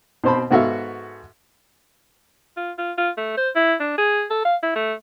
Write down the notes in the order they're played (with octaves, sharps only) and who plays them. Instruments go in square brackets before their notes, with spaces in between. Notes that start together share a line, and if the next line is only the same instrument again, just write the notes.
[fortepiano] B2 C4 C5 A5 B5
G#2 B3 F#4 A4 E5 F5
[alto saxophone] F4
F4
F4
A3
C5
E4
D4
G#4
A4
F5
E4
A3